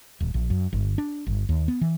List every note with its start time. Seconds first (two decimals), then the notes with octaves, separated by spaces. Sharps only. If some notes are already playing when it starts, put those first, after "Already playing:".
0.20 D#1
0.34 A#1
0.50 F#2
0.73 G1
0.98 D4
1.27 G1
1.49 D#2
1.68 B3
1.81 E3